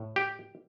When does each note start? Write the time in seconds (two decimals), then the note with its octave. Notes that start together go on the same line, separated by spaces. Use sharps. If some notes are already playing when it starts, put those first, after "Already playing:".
Already playing: A2
0.16 G4